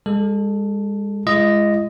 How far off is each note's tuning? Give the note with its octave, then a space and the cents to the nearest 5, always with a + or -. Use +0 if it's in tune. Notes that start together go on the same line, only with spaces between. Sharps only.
G#3 -35 A4 +0
G#3 +0 F4 -45 D#5 +0